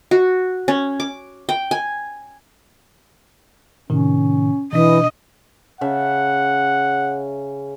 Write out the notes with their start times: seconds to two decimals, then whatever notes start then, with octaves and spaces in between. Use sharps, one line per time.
0.11 F#4
0.68 C#4
1.00 D6
1.49 G5
1.71 G#5
3.90 A2 C3 D#3 C#4
4.73 B2 E3 D4 D#5
5.81 C#3 E5 F#5 A5